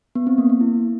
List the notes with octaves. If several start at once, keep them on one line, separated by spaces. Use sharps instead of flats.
B3
C4
A#3
A#3
E4